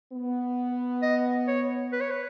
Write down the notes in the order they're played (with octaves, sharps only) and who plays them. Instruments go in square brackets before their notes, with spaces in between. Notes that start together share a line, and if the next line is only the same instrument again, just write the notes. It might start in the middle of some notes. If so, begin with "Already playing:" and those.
[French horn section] B3
[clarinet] D#5
C#5
B4
C#5
B4